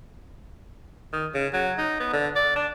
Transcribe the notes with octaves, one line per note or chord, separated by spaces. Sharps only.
D#3
C#3
F#3
D#4
B3
D3
D5
D4